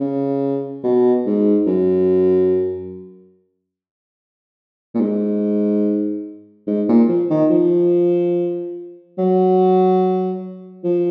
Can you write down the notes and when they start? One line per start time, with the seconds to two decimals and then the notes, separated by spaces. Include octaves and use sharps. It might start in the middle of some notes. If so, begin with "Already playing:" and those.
0.01 C#3
0.84 B2
1.26 G#2
1.67 F#2
4.95 A#2
5.01 G#2
6.67 G#2
6.89 A#2
7.09 F3
7.30 D#3
7.50 F3
9.18 F#3
10.84 F3